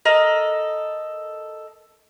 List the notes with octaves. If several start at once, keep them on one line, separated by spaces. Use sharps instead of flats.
A4 A#4 D#5